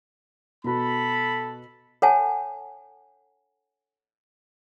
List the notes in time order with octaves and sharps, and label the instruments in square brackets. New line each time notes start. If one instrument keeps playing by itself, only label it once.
[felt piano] B2 F#4 [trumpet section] A4 B5
[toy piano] A4 C#5 F#5 G#5 A5